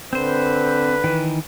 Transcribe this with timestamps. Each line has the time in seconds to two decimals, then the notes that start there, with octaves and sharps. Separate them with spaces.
0.13 D3 C4 B4 C5
1.04 D#3 E3